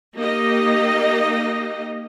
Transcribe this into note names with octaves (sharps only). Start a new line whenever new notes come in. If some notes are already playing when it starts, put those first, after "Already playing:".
A#3 D#4 G4 D#5